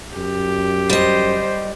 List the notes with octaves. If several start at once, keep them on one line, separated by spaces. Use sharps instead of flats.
F#2 G4
G3 C5 D#5